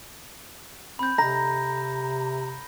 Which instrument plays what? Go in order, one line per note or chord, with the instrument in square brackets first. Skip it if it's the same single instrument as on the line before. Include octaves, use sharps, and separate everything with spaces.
[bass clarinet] C4 [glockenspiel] B5 G6
[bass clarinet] C3 [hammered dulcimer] A#5 [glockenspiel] A#6